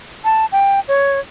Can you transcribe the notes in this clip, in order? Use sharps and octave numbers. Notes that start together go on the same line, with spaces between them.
A5
G5
C#5